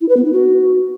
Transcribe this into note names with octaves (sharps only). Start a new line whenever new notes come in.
E4
B4
B3
D#4
F#4